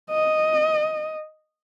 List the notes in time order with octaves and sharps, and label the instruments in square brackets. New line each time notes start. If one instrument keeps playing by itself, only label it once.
[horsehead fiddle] D#5